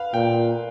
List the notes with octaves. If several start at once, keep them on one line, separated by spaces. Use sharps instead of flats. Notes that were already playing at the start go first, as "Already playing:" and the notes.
Already playing: B4 F5
A#2 G5